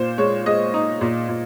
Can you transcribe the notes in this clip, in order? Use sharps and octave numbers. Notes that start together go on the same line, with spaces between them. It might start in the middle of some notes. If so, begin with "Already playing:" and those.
Already playing: A#2 C5
G#3 C#5
G#3 D#5
D#4
A#2
A#2